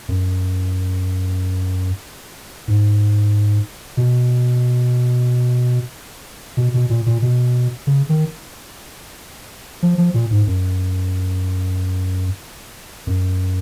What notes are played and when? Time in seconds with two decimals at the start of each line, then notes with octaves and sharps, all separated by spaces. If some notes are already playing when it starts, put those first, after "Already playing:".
0.08 F#2
2.68 G#2
3.97 B2
6.57 B2
6.74 B2
6.90 A#2
7.06 A#2
7.22 B2
7.87 C#3
8.09 D#3
9.83 F3
9.98 F3
10.14 A#2
10.31 G#2
10.47 F#2
13.07 F#2